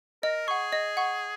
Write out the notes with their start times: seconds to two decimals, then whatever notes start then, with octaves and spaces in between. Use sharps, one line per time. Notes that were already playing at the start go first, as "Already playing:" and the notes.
0.23 A#4 D#5
0.48 G#4 F#5 C#6
0.73 D#5
0.97 F#5 C#6